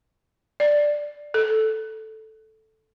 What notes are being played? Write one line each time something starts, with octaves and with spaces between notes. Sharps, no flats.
D5
A4